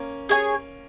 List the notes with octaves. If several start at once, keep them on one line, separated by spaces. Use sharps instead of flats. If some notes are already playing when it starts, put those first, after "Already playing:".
Already playing: A#3 C#4
G#4 C#5 G#5